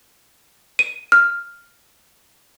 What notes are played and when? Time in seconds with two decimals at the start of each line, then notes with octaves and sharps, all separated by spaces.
0.79 D#7
1.12 F6